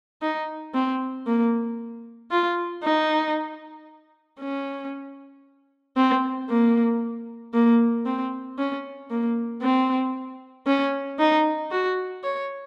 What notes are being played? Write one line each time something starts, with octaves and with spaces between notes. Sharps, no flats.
D#4
C4
A#3
F4
D#4
C#4
C4
A#3
A#3
C4
C#4
A#3
C4
C#4
D#4
F#4
C#5